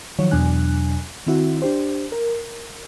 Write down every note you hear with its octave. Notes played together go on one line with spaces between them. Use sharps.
D#3 F3 F#3 F#4 C#5
E2 B2 F#3 D4 G#5 F#6
D#3 C4 E4 F#4
D4 G4 C5
A#4